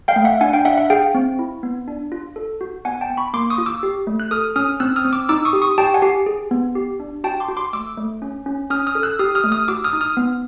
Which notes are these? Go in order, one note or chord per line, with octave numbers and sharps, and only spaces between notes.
F5 G5
A3
E5 F#5
D4 F#5 G#5
F5 G5
D4 E5 F#5
E5 F#5
G#4 F5 G5
C4
E4
B3
D4
F4
A4
F#4
B3 F#5 G#5
G5 A5
B3
B5 C#6
A#3 C6 D6
C#6 D#6
F4
D6 E6
G4
A3
F#6
A4 D#6 F6
C#4 D#6 F6
C4 E6 F#6
D#6 F6
C4
D6 E6
D#4 D6 E6
C#6 D#6
G4
C#6 D#6
G4 G5 A5
F#5 G#5
G4
G#4
B3
G4
D4
F#4 G5 A5
C6 D6
F#4
C6 D6
A3 D6 E6
A3
C#4
C#4
C#4 D#6 F6
D#6 F6
A4
E6 F#6
G4 D#6 F6
D#6 F6
A3
D#6 F6
F#4 D6 E6
D#6 F6
D#4
D#6 F6
B3